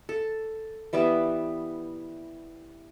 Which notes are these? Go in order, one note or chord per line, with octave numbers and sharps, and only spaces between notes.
A4
E3 G3 B3 E5